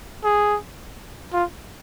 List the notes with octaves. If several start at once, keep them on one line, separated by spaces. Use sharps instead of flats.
G#4
F4